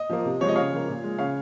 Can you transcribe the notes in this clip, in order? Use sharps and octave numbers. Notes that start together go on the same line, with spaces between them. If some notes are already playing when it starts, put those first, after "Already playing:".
Already playing: D#5
F3 A#3
C3
F3 G#3 C#5 D#5
C#3 C#5 F5
F3 A#3
A#2
G#3
C#3 C#5 F5